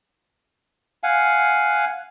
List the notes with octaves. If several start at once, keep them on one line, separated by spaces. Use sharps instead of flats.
F5 F#5 G#5